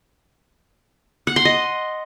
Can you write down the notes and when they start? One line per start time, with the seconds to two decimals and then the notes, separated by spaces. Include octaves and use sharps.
1.27 F#5
1.36 C6
1.45 D#5